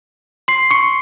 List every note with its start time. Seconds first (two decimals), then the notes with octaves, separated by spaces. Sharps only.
0.48 C6 C7
0.71 C#6 C#7